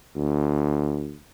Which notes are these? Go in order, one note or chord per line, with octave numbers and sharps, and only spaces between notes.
D2